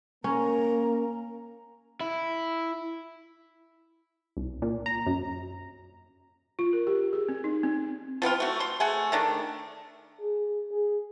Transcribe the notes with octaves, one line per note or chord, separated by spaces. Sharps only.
A#3 C#4 A#5
E4
C2
A#2
A#5
F#2
F4
A#4
G4
G#4
C4
D#4
C4
F3 B3 C4 F4
A3 F#4
C6
A3 G#4 F#5
D#3 A3 D4
G#4
G#4